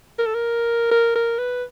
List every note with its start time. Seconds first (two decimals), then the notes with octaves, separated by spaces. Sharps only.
0.19 A#4
0.26 A4
0.34 A#4
0.91 A#4
1.16 A#4
1.38 B4